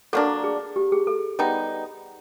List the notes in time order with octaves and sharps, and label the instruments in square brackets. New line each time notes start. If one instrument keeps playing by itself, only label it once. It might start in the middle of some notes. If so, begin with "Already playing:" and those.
[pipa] F#3 A#3 D4 [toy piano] A4
[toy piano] G#4
G4
G#4
A4
[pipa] G3 B3 D#4